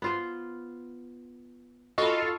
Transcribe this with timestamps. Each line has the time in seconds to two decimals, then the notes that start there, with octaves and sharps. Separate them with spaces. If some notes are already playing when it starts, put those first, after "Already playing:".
0.02 B3 F4 C5
1.98 F4 F#4 A4 D#5 F5 B5 C#6